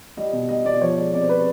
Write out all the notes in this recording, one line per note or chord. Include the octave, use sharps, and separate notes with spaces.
G3 D#5
B2
G3 D#5
B2 D5
F3 C#5
G#3 D5
C3 D5
C5
C3 B4